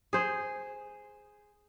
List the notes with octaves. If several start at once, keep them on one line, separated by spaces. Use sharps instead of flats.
G#4 C5